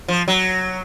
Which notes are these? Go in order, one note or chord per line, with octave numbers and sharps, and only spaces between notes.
F3
F#3